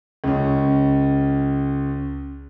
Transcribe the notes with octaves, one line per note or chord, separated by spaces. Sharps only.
C#2 C#4